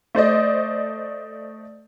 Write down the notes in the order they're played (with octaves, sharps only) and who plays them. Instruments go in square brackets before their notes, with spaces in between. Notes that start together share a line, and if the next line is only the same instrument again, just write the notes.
[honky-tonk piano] A3 C5 D5 D#5